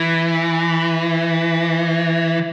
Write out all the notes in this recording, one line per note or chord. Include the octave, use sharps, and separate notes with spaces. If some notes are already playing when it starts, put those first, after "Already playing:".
Already playing: E3